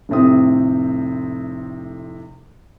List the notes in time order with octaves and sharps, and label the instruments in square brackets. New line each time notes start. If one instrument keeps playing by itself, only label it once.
[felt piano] F1 A2 C3 C4 D#6